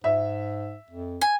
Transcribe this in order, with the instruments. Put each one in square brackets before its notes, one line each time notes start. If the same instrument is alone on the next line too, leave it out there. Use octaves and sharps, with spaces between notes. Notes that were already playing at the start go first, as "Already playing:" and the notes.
[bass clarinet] G#2 [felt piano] E5
[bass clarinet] F2
[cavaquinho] G#5